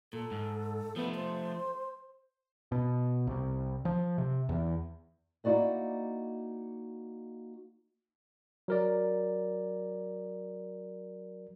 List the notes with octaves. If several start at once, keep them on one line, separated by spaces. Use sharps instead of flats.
A#2 A4
G#2
F3 A3 B3
C5
B2
C2
F3
C3
E2
A#3 D#4 E4 F#4 D5 D#5
F#3 A#4 D5